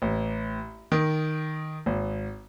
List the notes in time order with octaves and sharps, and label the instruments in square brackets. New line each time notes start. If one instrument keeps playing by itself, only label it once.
[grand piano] A1
D#3
G#1